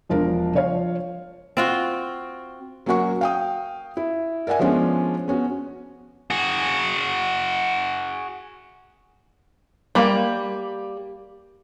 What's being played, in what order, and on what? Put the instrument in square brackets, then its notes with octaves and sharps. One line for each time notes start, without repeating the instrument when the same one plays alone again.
[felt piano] E1 F3 D4 A#4
F3 C#5 F5
[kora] C4 F4 F#4
[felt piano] F#3 A#3 C#4 F#4 F#5 C#6
F5 G5 D#6
E4
A#4 D5 E5 F#5 G#5
F3 G#3 B3 C#4 D4
B3 C#4 F#4
[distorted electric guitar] F#4 G#4
[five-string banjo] G3 A#3